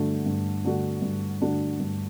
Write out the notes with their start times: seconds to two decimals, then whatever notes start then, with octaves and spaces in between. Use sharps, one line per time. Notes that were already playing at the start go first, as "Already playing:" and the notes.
Already playing: G2 D3 A3 D4 F#4
0.26 G2
0.64 D3 A3 D4 F#4
1.02 G2
1.41 D3 A3 D4 F#4
1.80 G2